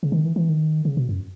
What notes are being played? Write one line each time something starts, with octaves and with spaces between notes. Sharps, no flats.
C#3
D#3
E3
E3
D#3
C#3
B2
F#2